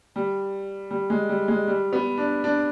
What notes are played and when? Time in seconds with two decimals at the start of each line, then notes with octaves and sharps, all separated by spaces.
0.16 G3
0.91 G3
1.10 G#3
1.29 G3
1.48 G#3
1.68 G3
1.93 B3
2.18 D4
2.44 D4